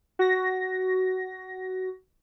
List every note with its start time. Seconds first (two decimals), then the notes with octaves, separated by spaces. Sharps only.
0.19 F#4 A#6